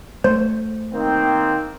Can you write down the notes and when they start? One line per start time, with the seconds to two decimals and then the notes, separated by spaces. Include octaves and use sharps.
0.24 A3 C5
0.93 D#3 A#3 C4